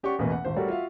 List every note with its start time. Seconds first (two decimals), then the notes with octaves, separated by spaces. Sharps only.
0.03 C#4 G4 D5 F#5 C#6
0.19 A1 E2 B2 A#3 B4
0.32 F#5
0.45 D#1 G#1 C5
0.56 G3 A3 F#4 A4 A#4 C#5
0.68 F4 F#4 E5 F5